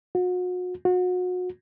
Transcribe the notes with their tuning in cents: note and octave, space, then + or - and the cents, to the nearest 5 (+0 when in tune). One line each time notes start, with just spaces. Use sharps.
F#4 -35
F#4 -30